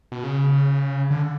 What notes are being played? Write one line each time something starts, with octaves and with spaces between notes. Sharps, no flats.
B2
C#3
D3